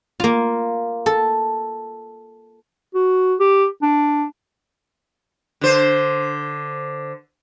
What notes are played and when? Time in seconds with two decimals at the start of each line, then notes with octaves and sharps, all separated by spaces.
0.20 A#3 F4
1.06 A4
2.95 F#4
3.40 G4
3.82 D4
5.61 D3 C5